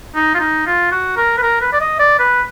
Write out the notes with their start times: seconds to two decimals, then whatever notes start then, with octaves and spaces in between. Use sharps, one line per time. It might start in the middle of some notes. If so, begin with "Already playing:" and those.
0.16 D#4
0.35 F4
0.40 D#4
0.66 F4
0.91 F#4
1.17 A#4
1.38 B4
1.43 A#4
1.61 B4
1.73 D5
1.80 D#5
1.99 D5
2.19 B4